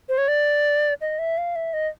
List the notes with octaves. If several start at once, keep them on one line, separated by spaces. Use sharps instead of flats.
C5
C#5
D5
D#5
E5
F5
E5
D#5